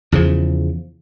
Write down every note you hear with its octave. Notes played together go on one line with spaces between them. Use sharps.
E2 C#3 F3